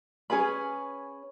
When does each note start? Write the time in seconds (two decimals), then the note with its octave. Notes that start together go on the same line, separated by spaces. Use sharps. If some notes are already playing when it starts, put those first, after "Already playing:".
0.30 C#4 G#4 B4 B5